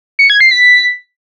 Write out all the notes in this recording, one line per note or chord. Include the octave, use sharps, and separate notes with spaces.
C#7
G#6
C7
B6